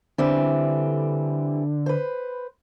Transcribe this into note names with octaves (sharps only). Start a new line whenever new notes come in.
D3 E3 G3 C4
B4 C5